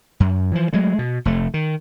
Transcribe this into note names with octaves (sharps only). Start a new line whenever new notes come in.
F#2
E3 F3
F#3 G#3 A3
B2
F1 A3
D#3